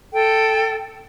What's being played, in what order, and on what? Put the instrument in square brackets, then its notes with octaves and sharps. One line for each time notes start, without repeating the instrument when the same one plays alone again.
[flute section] A4 G5